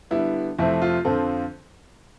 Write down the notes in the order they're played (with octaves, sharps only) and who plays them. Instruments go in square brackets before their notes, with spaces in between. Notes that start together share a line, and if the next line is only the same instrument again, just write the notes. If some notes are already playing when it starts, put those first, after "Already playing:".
[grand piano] D3 G3 B3 [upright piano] E4
[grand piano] F2 C3 F3 A3 C4 [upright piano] E4
[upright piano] F4
[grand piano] F2 D3 F3 C4 F4 [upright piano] A4